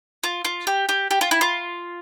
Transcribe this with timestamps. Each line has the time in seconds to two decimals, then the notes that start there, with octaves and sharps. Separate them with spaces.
0.23 F4
0.45 F4
0.67 G4
0.89 G4
1.11 G4
1.21 F4
1.31 E4
1.41 F4